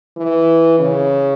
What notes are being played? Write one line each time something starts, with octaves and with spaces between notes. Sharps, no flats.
E3
C#3